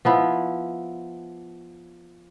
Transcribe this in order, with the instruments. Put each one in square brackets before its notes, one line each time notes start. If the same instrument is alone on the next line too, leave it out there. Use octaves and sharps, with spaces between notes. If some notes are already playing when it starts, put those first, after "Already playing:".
[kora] F3 B3 E4